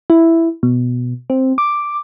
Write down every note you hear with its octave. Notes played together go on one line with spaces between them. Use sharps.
E4
B2
C4
D6